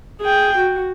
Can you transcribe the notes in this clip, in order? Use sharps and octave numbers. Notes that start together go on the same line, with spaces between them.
G#4 G5
F#4